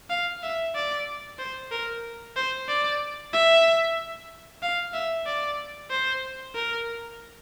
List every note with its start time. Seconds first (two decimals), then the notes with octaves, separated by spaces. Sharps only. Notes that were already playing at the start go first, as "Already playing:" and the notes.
0.10 F5
0.43 E5
0.75 D5
1.39 C5
1.71 A#4
2.36 C5
2.68 D5
3.33 E5
4.62 F5
4.94 E5
5.26 D5
5.90 C5
6.55 A#4